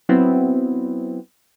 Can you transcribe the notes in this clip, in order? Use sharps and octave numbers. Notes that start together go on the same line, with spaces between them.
F#3 B3 C4 E4